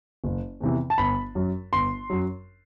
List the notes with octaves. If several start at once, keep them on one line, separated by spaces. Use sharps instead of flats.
F#1
E2 C3 E3
A5
G1 B5
F#2 F#3
G1 C6
F#2 F#3